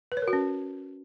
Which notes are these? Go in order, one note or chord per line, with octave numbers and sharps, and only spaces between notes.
B4
C#5
A#4
F#4
C#4